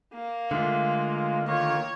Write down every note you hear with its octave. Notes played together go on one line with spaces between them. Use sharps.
A#3
D3 G#3 A3 F4
D#3 A#3 F4 C#5